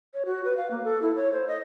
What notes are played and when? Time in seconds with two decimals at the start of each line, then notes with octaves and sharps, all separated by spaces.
0.14 C#5
0.25 F#4
0.45 B4
0.57 F5
0.71 A#3
0.84 A4
1.02 E4
1.16 C#5
1.32 C5
1.47 D#5